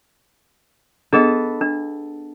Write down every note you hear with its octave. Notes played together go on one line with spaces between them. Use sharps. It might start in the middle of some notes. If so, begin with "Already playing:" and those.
B3 D4 G#4 A4 D#5 E7
D4